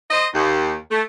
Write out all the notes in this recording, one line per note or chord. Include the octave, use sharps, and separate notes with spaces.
C5 D#5
D#2
A3